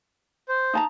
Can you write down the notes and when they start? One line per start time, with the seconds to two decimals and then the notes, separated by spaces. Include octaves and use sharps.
0.49 C5
0.73 D#4 A5 A#5